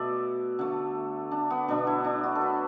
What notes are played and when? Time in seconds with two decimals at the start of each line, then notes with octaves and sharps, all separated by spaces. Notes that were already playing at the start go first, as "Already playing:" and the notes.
Already playing: B2 A3 D5 E5
0.59 D3 A3
1.31 D4
1.50 B3
1.68 B2 F#3 A3 D4
1.87 E4
2.04 D4
2.23 F#4
2.35 A4
2.41 B4